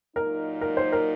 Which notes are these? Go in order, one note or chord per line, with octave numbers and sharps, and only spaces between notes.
A#2 F#3 A#3 D#4 A#4
A#4
C5
A#4